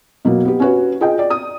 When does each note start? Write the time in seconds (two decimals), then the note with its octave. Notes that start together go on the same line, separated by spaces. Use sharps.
0.25 B2 F#3 A#3
0.45 B3 G4
0.60 C#4 F#4 B4
1.01 F4 G#4 D#5 G5
1.19 D5
1.30 D#6